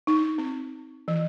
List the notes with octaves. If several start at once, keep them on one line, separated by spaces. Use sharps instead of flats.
D#4
C4
E3